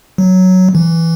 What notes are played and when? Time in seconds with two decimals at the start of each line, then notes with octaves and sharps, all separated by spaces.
0.18 F#3
0.75 E3